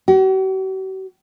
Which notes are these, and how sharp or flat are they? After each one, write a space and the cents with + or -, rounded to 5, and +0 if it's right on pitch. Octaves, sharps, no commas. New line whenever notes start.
F#4 +45